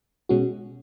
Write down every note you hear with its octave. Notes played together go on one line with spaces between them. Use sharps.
B2 G#3 C#4 F#4